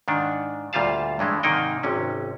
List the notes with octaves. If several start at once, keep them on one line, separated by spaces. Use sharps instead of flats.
G#2 D#3 D4
D2 A#2 G3 F4 F5 A5
G2 E3 G#3 A3
G#2 C3 D#3 A#3 D#4 G5
G#1 C3 C#4